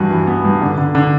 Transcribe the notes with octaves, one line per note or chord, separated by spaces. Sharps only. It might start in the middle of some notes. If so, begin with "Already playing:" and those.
Already playing: G2 E3 F#4
E3
B3
G2
D3
D3
D3